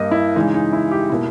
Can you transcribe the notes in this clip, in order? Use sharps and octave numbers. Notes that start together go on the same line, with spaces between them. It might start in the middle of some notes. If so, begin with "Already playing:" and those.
Already playing: G2 G3 A#3 D#5
E4
C#3 E3 G#3 D#4
D#4
E4
G4
B2 A#3 E4